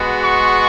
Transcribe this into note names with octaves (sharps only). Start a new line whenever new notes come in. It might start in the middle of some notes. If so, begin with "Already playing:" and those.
Already playing: G#3 B3 F#4
C#6